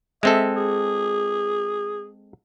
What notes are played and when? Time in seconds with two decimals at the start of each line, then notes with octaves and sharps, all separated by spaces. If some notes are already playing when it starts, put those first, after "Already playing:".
0.23 G#3 C4 A4 E5
0.56 G#4